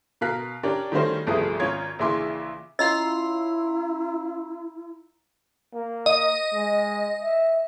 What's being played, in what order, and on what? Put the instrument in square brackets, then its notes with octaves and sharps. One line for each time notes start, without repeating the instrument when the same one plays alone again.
[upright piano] B2 A#4 F5 F#6 B6
C#4 D4 G4 A#4 D5
D#3 G3 A3 C#4 F#4 C5
G1 C2 F3 A3 G#4 D#6
G#1 C#4 F4 C#5 G#6
A#1 C#3 E3 E5 C6 D6
[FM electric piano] C#4 F4 C6 [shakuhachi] E4 [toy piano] D#5 [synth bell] F5 A#5 E6
[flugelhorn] A#3
[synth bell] D#5
[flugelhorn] G#3
E5